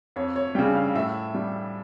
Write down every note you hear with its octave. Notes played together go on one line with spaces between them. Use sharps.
F2 C#5
C#5
C#3 G3 G5
F5
A2 E5
G3